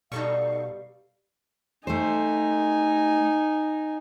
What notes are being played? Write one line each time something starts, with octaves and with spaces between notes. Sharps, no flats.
B2 G3 D#4 A4 F5 C#6
A3 D#4 G4 C5 G#5